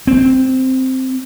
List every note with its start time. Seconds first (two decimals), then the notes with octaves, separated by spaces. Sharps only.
0.07 C4